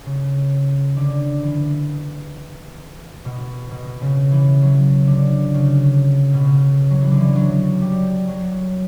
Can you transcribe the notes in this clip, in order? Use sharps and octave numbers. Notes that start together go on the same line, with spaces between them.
C#3
D3
E3
B2
B2
C#3
E3
F#3
D3
C#3
B2
C#3
F#3
E3
D3
E3
F#3
G3
F#3